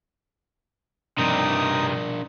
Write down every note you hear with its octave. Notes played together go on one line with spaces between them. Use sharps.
G2 C3 D4 D#4 A#4 D#6